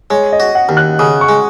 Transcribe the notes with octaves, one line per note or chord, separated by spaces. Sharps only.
G#3 C#5
D#5
F#4
F#5
D#2
F#6
C#3 D#6
C#6
G#3